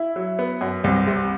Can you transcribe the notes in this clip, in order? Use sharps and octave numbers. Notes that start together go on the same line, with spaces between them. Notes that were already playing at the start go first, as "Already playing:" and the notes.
Already playing: E4
F#3
B3
F#2
C2
C3